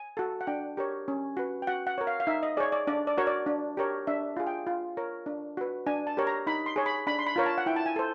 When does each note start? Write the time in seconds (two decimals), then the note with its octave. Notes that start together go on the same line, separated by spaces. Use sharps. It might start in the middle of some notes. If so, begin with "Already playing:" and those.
Already playing: G#5
0.17 F#4 A4
0.41 F#5
0.47 D4 G5
0.77 G4 A#4 C#5
1.08 C#4
1.37 F#4 B4
1.62 G5
1.67 F#4 F#5
1.87 F#5
1.98 A#4 C#5
2.07 F5
2.20 F5
2.27 D#4 E5
2.43 D#5
2.57 G#4 C#5 D5
2.72 D5
2.87 D4 D5
3.07 D5
3.18 F#4 A#4 C#5
3.27 D5
3.46 D4
3.77 G4 A#4 C#5
4.07 D4 E5
4.37 F4 G#4
4.47 G5
4.67 F4
4.97 A#4 C#5
5.26 D4
5.57 F#4 B4
5.87 D4 G#5
6.07 A5
6.17 G4 A#4 C#5
6.27 A#5
6.47 D#4 B5
6.66 C6
6.76 G#4 C#5
6.86 B5
7.07 D4 B5
7.19 C6
7.27 B5
7.36 F4 A#4 C#5
7.46 A5
7.58 F#5
7.66 E4 G5
7.76 A5
7.86 G#5
7.96 A4 C5